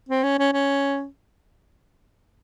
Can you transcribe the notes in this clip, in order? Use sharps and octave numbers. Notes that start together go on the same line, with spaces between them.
C4
C#4
C#4
C#4